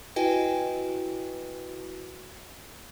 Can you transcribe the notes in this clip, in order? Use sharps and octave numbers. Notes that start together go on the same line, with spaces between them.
E4 F#4 B4 D#5 G5 G#5